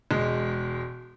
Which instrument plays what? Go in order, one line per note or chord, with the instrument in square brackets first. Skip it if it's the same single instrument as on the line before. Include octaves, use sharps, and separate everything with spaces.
[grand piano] E1 G#3